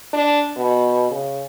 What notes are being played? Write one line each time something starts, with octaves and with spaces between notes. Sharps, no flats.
D4
B2
C#3